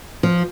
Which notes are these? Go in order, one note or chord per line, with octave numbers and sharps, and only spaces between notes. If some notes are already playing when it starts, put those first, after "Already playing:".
F3